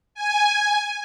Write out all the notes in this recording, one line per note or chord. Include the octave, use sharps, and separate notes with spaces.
G#5